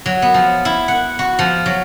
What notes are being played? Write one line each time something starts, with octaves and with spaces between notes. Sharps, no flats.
F#3
B3
F3
E4
F#5
F#4
F3
F#3